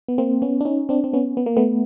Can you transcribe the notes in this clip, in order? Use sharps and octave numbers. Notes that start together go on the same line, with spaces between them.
B3
A#3 C4
B3 C#4
D4
C#4 D#4
C4 D4
C4
B3 C#4
B3
A#3
A3 B3